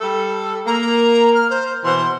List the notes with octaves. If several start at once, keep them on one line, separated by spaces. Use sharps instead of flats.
G3 A4
A#3 A#5
F6
C5
B2 E3 C5 C6